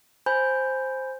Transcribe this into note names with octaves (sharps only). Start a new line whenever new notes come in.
C5 G#5 B5 G6